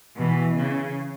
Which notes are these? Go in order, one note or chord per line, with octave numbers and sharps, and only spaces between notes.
B2 E3
C#3